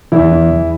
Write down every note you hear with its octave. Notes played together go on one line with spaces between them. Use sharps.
E2 E4
E3
E2